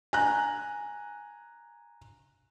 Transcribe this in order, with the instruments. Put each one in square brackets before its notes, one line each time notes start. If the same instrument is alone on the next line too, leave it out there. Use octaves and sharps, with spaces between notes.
[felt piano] G#5 A#5 F#6